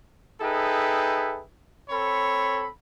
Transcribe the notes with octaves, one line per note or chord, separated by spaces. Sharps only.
D#4 G#4 A4 B4 E5 G5
C4 A4 C#5 B5